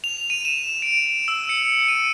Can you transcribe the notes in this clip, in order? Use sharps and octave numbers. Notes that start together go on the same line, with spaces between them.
F7
D#7
E7
D7
E6
C#7
D#7